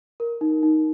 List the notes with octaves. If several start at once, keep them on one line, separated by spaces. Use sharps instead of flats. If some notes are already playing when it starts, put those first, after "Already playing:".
A#4
D#4
D#4